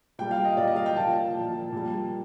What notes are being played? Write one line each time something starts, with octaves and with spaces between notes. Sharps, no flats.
A#2 G3 G5
F5
D#5
A#2 G3 D5
D#5
F5
G5
A#2 F3 A5
A#2 F3
A#2 G3